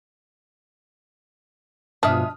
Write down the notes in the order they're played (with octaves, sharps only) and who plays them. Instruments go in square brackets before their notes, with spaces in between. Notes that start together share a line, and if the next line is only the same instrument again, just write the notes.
[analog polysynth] G2 B2 F3 [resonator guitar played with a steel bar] G#3 E5 [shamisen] D4 [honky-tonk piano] D#6 F6